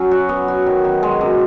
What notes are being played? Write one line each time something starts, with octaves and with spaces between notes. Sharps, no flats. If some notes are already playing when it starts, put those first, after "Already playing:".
Already playing: F#3 C#4
F#4
B3
F#4
D#3
D#3
G#3
F#2